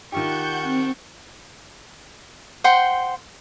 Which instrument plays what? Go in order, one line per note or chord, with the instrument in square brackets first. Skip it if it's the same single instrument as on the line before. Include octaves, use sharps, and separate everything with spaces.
[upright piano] D#3 F4 G4 [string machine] F#5 G6 [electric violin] A5 C#6
[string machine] C4
[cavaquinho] C5 F#5 G5 C6